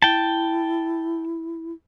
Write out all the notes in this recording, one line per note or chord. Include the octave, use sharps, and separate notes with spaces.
E4 G5 A5